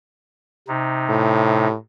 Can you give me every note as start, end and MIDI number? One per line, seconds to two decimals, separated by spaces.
0.68 1.68 48
0.68 1.68 63
1.09 1.75 45